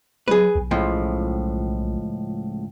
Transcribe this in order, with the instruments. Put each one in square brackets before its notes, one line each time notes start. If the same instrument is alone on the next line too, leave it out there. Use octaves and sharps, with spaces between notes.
[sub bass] F#3 [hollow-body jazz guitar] G#4 B4
[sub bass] B1
[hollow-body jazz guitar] C#2 A2 F3